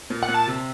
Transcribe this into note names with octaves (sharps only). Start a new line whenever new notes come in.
A#2
F#5
A#2
A5
C3